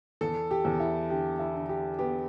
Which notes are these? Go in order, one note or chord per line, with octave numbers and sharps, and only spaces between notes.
E2 A4
G4
E2
E4
D3 G4
E4
D3
G4
B3 G4